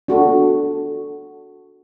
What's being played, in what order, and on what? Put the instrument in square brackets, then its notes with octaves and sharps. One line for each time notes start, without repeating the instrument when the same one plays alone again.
[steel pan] D4 F#4 A4